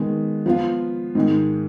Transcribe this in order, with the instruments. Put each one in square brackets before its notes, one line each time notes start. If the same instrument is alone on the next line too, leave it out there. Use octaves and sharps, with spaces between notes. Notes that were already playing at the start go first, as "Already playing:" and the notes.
Already playing: [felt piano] D#3 G#3 B3
F3 B3 F4
G#2 D#3 G#3